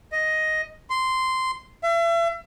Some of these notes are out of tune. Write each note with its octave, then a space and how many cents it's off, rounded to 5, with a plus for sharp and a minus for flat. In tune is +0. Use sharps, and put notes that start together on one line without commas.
D#5 +5
C6 -10
E5 +40